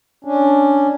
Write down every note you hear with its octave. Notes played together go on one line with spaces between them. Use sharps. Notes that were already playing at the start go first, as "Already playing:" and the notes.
C#4 D4